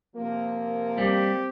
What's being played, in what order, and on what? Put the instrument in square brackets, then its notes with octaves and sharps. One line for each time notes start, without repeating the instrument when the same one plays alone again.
[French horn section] C3 F3 A#3
[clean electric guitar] G3 [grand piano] C4 [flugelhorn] G4